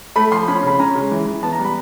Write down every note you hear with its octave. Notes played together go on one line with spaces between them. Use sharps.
A3 B5
F3 C6
C#4 B5
C#3 B5
C#4 A#5
G#3
E3
E3
B3 A5
A#5
G3
B5